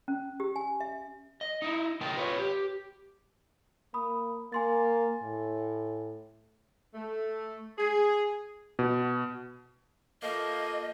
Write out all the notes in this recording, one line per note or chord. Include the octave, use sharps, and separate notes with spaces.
C#4
G4
G#5
E5
D#5
D#4 E4
C#3 D4 A#4 D#5 G5 A5
F4 B4 C#5
G4
A#3 B5 D#6
A#3 G#5 C6 A6
A2
A3
G#4
B2
F3 A3 A#3 D#5